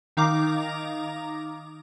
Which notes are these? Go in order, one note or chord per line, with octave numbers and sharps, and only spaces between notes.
D#3 D#4 F5 A#5 D6